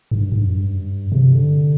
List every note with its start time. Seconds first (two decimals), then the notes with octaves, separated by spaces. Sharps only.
0.11 G2
0.32 G2
0.43 F#2
0.53 G2
1.12 C3
1.33 D3